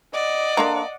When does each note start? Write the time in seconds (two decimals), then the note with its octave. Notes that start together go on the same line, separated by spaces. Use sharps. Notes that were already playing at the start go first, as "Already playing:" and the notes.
0.14 D5 D#5 F#5
0.57 A#3 D4 A4 C5 F5 A#5